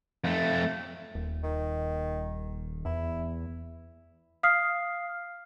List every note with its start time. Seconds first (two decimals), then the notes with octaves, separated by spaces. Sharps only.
0.24 F2 A3
1.15 D#1
1.43 D#3
2.85 E2 E4
4.43 F5 D#6 F6 C7